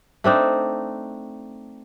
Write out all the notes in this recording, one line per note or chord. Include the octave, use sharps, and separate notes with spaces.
A3 C4 D4 D#4